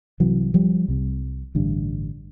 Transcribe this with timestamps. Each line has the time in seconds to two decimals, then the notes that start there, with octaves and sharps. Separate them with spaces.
0.20 C2 C3 E3 F#3
0.54 F3 G3
0.88 C2 C3
1.55 A1 G2 D3